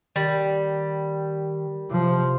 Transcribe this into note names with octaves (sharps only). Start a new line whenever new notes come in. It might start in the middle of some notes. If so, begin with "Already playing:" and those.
D#3 G3
C3 F3